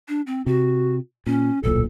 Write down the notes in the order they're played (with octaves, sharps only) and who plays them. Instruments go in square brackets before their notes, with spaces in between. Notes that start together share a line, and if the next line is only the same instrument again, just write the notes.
[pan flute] D4
C4
[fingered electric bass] C3 [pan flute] F#4
[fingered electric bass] A#2 [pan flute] C#4
[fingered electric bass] D1 B1 A#2 [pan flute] A4